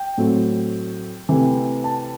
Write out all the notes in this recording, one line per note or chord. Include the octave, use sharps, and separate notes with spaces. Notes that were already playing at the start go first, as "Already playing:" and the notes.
Already playing: G5
A2 F#3 A3 C4
C3 E3 A3 C4
A5